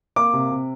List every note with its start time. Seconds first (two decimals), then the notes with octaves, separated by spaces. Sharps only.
0.16 A#3 D6
0.33 C3
0.51 C3